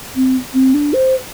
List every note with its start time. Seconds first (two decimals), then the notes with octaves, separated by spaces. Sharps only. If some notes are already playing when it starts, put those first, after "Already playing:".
0.16 C4
0.54 C4
0.74 D4
0.93 C5